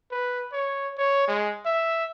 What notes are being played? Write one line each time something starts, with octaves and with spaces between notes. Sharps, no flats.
B4
C#5
C#5
G#3
E5